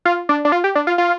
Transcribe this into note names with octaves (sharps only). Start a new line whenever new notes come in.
F4
D4
D4
F4
G4
D4
F4
F4